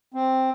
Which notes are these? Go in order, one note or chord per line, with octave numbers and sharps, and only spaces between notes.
C4